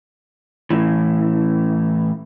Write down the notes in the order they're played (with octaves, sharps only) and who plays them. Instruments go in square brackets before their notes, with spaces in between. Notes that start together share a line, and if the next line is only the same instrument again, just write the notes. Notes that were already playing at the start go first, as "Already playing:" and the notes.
[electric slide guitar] A2 E3